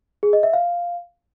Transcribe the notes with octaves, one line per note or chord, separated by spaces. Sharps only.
G#4
D#5
E5
F5